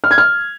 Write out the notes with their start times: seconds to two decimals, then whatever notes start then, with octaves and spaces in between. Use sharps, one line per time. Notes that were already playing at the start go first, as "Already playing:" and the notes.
0.04 F6
0.11 G#6
0.18 F6